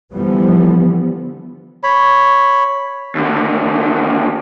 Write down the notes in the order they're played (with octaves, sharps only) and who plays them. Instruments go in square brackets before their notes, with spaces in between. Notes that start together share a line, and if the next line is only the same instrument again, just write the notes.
[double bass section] D3 E3 F3 G3 B3
[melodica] C#5 B5
[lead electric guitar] D#2 D3